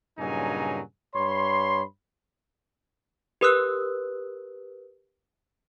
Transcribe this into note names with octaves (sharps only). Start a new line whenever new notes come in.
G2 A#2 C#3 F#3 D#4 G#5
G2 C#5 B5 C6
G4 A#4 B4 D#6 E6 F#6